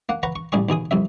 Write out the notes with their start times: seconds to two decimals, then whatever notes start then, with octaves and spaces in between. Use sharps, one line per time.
0.09 A#3 F#5
0.23 B4 F#5 A#5 C#6
0.36 C#6
0.52 A1 G3 G#4 C#6
0.69 D#2 B2 G#4 D#6
0.91 C2 F2 E5